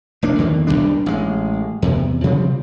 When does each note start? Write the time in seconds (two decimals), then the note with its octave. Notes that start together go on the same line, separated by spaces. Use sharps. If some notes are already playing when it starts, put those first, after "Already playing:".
0.22 F1 A#3 D4
0.38 E2 D3 D#3 A#3
0.67 F#1 F#2 G3 D4
1.06 A1 G#3
1.82 E2 C3
2.24 C3 F3 G3 C4